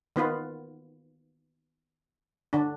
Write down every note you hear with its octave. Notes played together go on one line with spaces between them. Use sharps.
D#3 B3 F4 B4
D3 D4